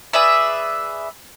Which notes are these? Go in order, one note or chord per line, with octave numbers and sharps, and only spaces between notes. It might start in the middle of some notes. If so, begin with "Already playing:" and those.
G#4 B4 D5 E5